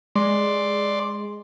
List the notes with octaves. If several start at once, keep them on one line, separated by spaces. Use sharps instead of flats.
G#3 D5 C6